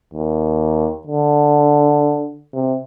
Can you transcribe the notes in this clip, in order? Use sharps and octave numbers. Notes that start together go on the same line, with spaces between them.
D#2
D3
C3